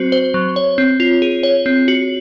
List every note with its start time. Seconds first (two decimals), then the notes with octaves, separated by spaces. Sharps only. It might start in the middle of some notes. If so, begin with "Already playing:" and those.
Already playing: F#3 C4 F#4 C5
0.12 C5
0.34 F#3
0.56 C#5
0.78 C4
1.00 F4
1.22 G#4
1.43 C#5
1.66 C4
1.88 F#4